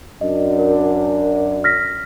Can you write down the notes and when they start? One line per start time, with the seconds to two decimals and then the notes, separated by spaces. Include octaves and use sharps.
0.21 F#2 D4 D#5
0.59 A#4
1.64 F6 A#6 B6